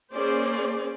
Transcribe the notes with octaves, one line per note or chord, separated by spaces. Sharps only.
A#3 C#4 G#4 C5 D5